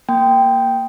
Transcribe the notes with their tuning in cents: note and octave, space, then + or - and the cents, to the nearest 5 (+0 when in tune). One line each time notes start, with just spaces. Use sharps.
A#3 +0 G5 +0